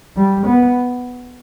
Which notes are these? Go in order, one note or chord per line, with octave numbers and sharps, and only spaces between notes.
G3
B3